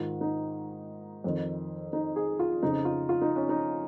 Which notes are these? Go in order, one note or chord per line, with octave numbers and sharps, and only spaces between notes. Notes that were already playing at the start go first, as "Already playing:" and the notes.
Already playing: G#2 D#3 F4
D#4
F2 D#3
D#4
G#4
F4
F2 C#3 F3 D#4
F4
F4
D#4
C#4
D#4